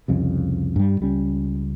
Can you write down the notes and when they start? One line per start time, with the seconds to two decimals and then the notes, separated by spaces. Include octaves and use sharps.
0.08 C2 F2 C#3
0.76 G2 G3
1.01 C#2 G3 C#4